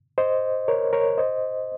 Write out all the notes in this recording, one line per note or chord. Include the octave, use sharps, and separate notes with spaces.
C5 D#5
A#4 C#5
A#4 C#5
C5 D#5